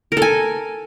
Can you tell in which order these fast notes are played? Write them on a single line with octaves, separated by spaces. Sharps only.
A#4 A4 G#5